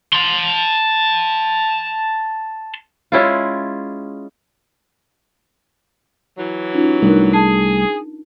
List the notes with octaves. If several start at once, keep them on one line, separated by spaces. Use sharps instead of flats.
A5 C6
G#3 C#4 E4 F4
E3 F#3
C#4 D#4 F4
C2 G3 A3 D4 D#4 A#4
G#4 A5